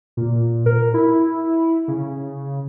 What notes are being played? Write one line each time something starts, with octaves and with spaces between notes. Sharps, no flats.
A#2
A#4
E4
C#3